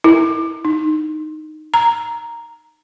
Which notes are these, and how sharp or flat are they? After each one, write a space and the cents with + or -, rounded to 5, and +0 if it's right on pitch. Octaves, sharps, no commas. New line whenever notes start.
E4 -15
D#4 -10
A#5 +0